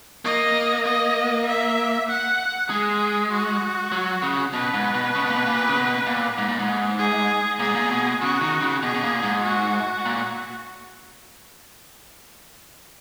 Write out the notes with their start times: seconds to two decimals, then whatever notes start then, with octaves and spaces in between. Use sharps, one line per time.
0.25 A#3 D#5
0.86 D#5
1.47 E5
2.09 F#5
2.70 G#3 G#4
3.31 F#4
3.92 F#3
4.23 C#3
4.53 B2 B4
4.74 G#2
4.94 B2
5.15 C#3
5.22 B2
5.30 A#2
5.36 B2
5.46 A#2
5.68 C#3
5.76 B2
6.06 A#2
6.38 G#2
6.48 A#2
6.59 G#2
6.99 G#4
7.59 A#2 G#4
7.68 G#2
7.75 A#2
7.86 A#2
7.91 B2
8.21 C#3 F#4
8.41 D#3
8.62 C#3
8.83 B2 G#4
8.94 B2
9.03 A#2
9.23 G#2
9.44 F#4
10.06 A#2